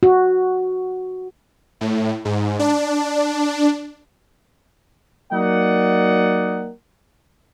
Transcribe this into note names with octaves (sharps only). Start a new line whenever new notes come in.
F#4
A2
G#2
D4
F#3 A#3 D#4 D5 F#5